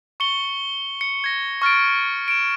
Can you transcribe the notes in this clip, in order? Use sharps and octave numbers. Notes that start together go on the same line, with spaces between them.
C#6 C#7 G7
C#7
G#6 A#6
C#6 F6 A6 D7
D7 E7